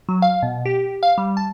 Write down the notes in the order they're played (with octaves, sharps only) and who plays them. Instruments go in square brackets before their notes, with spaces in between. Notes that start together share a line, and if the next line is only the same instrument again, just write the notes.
[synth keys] F#3
F5
B2
G4
F5
G3
A5